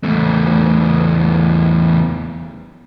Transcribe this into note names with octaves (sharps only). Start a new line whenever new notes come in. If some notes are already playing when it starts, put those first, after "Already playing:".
E2 A3